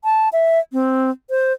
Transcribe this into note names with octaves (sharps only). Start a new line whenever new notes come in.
A5
E5
C4
C5